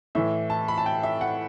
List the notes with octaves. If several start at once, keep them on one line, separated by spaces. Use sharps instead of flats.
A2 E3 E5
A5
B5
A5
G5
E5
F#5